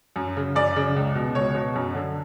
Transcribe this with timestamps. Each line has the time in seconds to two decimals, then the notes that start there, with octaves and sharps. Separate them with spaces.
0.16 F#2
0.37 C#3
0.56 F#2 D5
0.76 C#3
0.96 C#2
1.15 B2
1.35 C#2 C#5
1.55 B2
1.75 F#2
1.94 D3